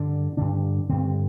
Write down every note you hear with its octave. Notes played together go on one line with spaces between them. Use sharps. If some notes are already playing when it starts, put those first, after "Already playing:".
Already playing: G2 D3 D4
G2 D3 D4
G2 D3 C4